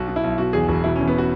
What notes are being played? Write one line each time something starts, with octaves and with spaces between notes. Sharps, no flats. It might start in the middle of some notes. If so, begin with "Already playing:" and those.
Already playing: B1 F#4
B2
E4
B1
B2 F#4
E2 G#4
E1 F#4
B2 E4
C#4
E2
B3
F#4